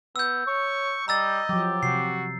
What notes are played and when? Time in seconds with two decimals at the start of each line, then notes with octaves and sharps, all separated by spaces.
0.16 B3 E6 G6
0.47 C#5 C#6
1.08 G3 D#5 A#5 E6 A6
1.49 F3 F#3 G4
1.83 C3 F#4 C7